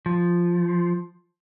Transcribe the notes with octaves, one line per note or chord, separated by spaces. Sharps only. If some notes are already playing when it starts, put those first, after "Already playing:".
F3